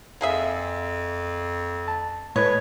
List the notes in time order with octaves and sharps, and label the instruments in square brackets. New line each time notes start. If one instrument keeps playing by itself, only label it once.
[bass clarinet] F2 [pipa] A#3 G#4 E5
[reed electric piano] A5
[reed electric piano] A2 B4 G#6 [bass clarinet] G#3 [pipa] C#5